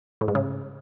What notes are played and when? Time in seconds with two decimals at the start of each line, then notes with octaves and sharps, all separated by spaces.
0.21 A2
0.28 G#2
0.35 C#3